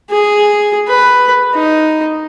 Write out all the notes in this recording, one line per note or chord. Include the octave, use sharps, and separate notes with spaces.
G#4
B4
D#4